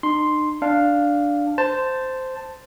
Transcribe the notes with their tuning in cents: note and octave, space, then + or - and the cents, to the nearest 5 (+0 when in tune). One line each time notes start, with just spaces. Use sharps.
D#4 -45 C6 +0
D4 +0 F5 +0
C5 -10 A5 +5